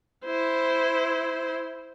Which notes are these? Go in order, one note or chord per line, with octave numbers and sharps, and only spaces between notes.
E4 C5